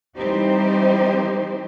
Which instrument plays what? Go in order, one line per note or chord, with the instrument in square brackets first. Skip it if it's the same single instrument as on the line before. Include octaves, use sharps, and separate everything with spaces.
[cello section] E3 G3 C4 D#4 G4 C5